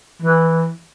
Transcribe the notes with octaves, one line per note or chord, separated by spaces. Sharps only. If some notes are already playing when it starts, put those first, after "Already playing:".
E3